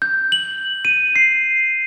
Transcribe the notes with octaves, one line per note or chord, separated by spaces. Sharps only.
G6
F#7
D#7
C7